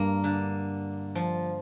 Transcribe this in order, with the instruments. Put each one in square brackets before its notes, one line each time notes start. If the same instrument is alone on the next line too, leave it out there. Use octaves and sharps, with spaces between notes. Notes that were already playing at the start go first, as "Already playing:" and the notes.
Already playing: [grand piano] G2 G3 D4 [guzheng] A#3
[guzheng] D3
F3